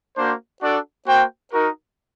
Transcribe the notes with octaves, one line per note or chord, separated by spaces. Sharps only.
A#3 D4 F#4 C5
D4 F#4 A4 D5 F#5
A#3 F#4 C5 G5
D#4 F#4 A#4